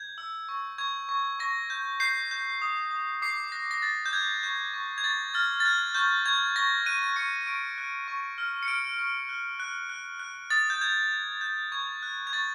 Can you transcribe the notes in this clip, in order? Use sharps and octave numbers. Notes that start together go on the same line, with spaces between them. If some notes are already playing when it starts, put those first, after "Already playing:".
Already playing: G6 G#6
E6
C#6
C#6 G#6
C#6
C#6 A#6
G6
G6 C7
G6
D#6
D#6
D6 C7
F#6 A#6
A#6
F#6 A6
G6
F#6 G#6
C#6 G6
C#6
G#6
C#6 A6
F6 A6
A6
F#6 G#6
C#6 G6
C#6 G#6
C#6 A#6
F#6 D#7
C#6 C#7
C#6 D7
F#6
C#6
F6
C#7
F6 D7
C#6
F#6
F#6
F#6
F#6
D#6 A6
G6
G6 G#6
G6
G6
C#6 G#6
F#6
G#6
C#6 A6